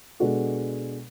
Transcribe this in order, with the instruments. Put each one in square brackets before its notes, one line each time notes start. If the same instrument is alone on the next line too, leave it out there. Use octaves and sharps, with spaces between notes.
[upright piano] B2 G#3 D4 F#4 A4